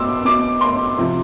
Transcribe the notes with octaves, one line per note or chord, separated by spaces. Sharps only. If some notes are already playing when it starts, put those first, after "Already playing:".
Already playing: B2 C6 D6 E6
B2 D6
C6
C3 F3